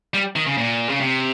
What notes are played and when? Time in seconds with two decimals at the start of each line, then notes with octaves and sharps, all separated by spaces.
0.14 G3
0.36 D#3
0.47 C#3
0.58 A#2
0.89 C#3
1.01 C3